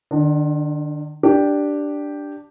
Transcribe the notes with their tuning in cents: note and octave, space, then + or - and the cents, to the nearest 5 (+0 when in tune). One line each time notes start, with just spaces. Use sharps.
D#3 -45 D4 +0
D4 +0 G4 +0